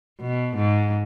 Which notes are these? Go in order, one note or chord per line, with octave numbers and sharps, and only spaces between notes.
B2
G#2